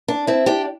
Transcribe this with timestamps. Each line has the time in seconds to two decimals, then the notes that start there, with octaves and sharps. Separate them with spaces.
0.08 D4
0.27 C4 E4
0.46 D4 G4